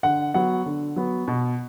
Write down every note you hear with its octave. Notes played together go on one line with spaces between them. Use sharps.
D3 F#5
F#3 B3 F#5
D3
F#3 B3
B2